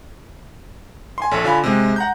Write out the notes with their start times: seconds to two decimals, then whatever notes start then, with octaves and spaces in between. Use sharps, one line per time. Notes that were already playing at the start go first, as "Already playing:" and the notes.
1.18 G#5 C6
1.31 A#1 A4 C#5
1.44 D3 F4 G#5 B5
1.64 C3 G#3
1.96 F#5 A#5 G6